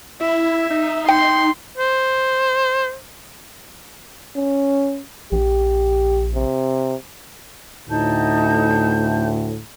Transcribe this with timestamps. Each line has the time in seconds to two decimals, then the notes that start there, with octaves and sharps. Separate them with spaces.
0.21 E4 E5
0.70 D#4
1.09 G5 C6
1.78 C5
4.35 C#4
5.32 A#1 G4
6.35 C3
7.89 D2 A2 D#4 A5 G6